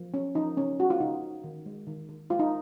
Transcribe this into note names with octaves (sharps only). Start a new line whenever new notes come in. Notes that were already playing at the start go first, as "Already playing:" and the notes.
Already playing: F3
C#4
F3 D#4
C#3 C#4
G#3 F#4
F4
C#3 D#4
C#4
D#3
G#3
D#3
D#3
G#3 F4
D#4